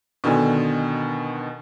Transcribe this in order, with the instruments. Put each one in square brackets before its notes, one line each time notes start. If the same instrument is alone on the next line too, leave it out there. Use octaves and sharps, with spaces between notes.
[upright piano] B2 D3 D#3 G#5